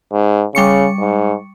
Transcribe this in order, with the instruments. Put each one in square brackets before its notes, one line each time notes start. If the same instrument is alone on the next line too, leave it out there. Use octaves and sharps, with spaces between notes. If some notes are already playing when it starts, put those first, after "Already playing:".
[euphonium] G#2
[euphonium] C#3 [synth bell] G3 C#6 C#7
[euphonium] G#2